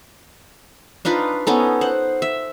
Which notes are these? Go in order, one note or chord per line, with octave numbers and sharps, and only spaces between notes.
D4 D#4 F4 B4
B3 C#4 D#4 A4
C5 F#5
E5